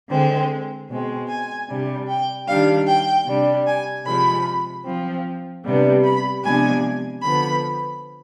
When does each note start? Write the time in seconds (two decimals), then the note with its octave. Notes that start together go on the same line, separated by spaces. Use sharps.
0.10 D3 G#3 C4
0.89 B2 G#3 C4
1.29 G#5
1.68 C3 G3 D4
2.08 G5
2.48 D#3 G3 D4 F5
2.87 G5
3.27 C3 G3 D4
3.67 G#5
4.06 C3 F3 G#3 B5
4.86 F3 C4
5.65 C3 G3 B3 D4
6.04 B5
6.44 C3 F3 G#3 B3 D4 G#5
7.23 D3 F3 B3 B5